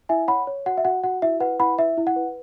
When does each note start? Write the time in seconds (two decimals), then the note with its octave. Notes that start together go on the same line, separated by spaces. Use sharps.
0.09 E4 E5 G#5
0.28 C#5 F#5 B5
0.47 C#5
0.66 F#4 F#5
0.77 E5
0.85 F#4 F#5
1.04 F#4 F#5
1.22 E4 E5
1.40 B4 F#5
1.60 E4 F#5 B5
1.78 E4 E5
1.97 E4
2.07 F#5
2.16 B4